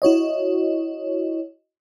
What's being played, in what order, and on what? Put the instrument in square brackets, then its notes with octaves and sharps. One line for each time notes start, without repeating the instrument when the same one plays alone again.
[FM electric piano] E4 F#4 C#5 D#5